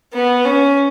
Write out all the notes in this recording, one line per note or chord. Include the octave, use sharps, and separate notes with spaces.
B3
C#4